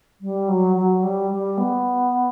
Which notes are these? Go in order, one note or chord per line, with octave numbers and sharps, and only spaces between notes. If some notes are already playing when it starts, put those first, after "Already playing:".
G3
F#3
F#3
G3
G3
B3